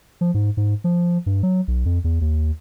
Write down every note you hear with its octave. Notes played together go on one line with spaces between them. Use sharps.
F3
G#2
G#2
F3
G2
F#3
B1
F2
E2
D#2